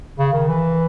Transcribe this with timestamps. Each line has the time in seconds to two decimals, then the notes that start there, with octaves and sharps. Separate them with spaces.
0.19 C#3
0.33 D#3
0.48 E3